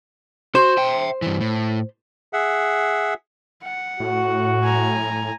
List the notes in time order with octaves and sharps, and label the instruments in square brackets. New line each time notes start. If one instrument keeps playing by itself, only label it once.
[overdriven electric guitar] F#4 [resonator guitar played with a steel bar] C5
[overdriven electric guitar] E5 G5
G2 E3
A2
[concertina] G#4 E5 F#5
[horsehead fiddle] F#5
[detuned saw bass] A2 [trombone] F#4
[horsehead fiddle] G#5 A#5